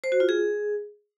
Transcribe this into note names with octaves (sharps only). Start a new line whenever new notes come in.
C5
F#4
F4
G#4